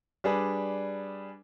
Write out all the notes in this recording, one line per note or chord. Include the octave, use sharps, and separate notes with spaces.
G3 D4 G#4 B4